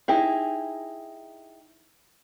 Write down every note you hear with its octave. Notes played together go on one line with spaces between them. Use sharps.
D#4 E4 G4 G#4